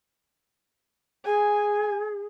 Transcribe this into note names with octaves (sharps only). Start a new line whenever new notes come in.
G#4 G#5